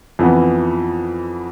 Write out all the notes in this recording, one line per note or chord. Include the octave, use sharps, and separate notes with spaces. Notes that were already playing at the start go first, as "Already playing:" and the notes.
F2 E3 B3